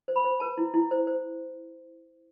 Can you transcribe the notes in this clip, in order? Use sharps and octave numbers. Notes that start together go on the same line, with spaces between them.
C5
B5
C5
B4 A5
E4
E4
C5
C5